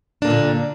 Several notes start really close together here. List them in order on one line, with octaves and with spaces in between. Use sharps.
D4 A#3 A#2 D3